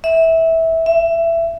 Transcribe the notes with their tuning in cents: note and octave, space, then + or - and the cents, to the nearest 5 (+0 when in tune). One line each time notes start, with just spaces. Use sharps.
E5 -15
E5 +20